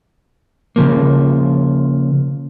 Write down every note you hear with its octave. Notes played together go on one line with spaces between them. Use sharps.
C#3 F3 A#3